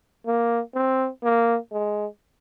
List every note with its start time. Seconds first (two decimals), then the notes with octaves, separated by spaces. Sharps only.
0.26 A#3
0.75 C4
1.24 A#3
1.72 G#3